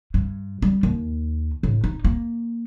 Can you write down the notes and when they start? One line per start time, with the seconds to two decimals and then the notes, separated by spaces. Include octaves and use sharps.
0.14 G2
0.62 G3
0.83 D#2
1.63 A2
1.84 D#4
2.04 A#3